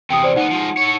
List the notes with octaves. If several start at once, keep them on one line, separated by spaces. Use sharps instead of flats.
E2 C3 G5 D#6
C5 D5
D2 B3 D#4 F#5
F3 G#3
A4 C#5